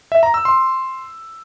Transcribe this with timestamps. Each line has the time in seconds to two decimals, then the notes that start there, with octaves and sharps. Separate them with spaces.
0.12 E5
0.23 A#5
0.34 E6
0.45 C6